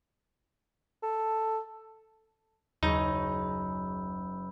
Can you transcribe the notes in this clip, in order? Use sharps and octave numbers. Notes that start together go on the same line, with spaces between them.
A4
F#1 D#2 D#4 G#4 B5 C#6 E6 G6